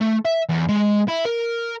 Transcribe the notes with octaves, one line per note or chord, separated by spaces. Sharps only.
A3
E5
E2
G#3
E4
A#4